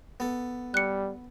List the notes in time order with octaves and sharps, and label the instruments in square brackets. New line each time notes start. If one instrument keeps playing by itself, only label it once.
[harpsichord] B3 A4
[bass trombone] G3 [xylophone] F#6 C#7